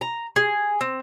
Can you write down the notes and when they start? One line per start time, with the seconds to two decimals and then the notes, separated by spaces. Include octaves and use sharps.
0.01 A#5
0.36 G#4
0.81 C4